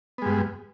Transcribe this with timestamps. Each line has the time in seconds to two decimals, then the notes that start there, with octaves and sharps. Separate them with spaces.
0.18 B3
0.22 G#3
0.25 G2